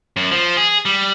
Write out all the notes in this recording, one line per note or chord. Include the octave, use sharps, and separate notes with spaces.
F#2
F3
G#4
G3